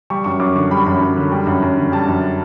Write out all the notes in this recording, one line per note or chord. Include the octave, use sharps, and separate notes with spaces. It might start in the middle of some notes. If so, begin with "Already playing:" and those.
G3 C#6
F#2 C#6
F#2 D6
D3 C#6
G3 B5
F#2
F#2
D3
G3
F#2
F#2
D3
G3 A5
F#2